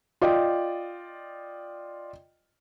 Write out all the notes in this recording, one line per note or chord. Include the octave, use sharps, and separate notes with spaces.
F4 D5 D#5 G5